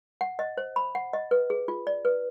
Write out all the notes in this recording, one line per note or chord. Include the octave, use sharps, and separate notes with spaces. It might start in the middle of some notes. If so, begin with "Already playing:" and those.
F#5
D#5
C5
B5
F#5
D#5
B4
G#4
F4
D5
B4